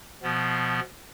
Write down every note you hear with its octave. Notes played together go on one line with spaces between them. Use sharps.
B2 F3 B3